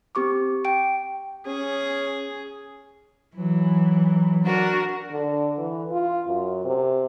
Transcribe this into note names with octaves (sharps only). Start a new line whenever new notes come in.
C4 G4 C#6 D6
G5 D7
C#4 G#4
E3 F#3
D4 F#4 A#4
D3
E3
F4
F#2
C3